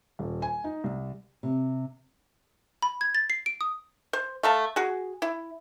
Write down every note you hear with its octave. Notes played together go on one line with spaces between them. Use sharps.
D#1
G#5
D#4
C2
C3
B5
G#6
A6
C7
D7
D#6
C5
A3 F5 A5
F#4 G#4
E4